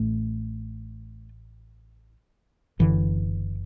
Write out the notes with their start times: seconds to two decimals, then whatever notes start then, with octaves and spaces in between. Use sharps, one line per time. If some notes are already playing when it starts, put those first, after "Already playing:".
Already playing: A1 A2 A3
2.79 F#1 F#2 D3 E3